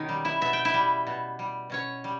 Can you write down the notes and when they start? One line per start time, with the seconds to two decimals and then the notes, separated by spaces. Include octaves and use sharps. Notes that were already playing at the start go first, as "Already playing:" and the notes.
Already playing: B2 D#3 C#4 D#4
0.09 G3
0.25 E4 E5
0.41 B2 E5
0.53 G5
0.65 E4 E5
0.74 G3
1.07 B2
1.39 G3
1.70 B2 C#4 C#5
2.04 G3